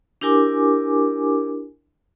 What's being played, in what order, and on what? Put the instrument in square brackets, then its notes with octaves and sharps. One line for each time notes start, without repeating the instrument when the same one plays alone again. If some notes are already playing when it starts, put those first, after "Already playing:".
[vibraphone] D4 E4 G4 A#4 G#5 D6